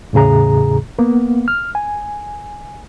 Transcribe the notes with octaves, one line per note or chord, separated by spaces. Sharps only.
E2 A2 C#3 G#4 A#5
A#3 B3
F6
G#5